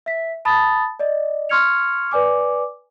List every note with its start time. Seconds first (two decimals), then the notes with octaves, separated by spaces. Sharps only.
0.06 E5 B6
0.45 A5 B5 D#6 A6
0.99 D5 D#5
1.49 C6 C#6 F6 G#6 C#7 F7
2.12 B4 D5 G#5 D6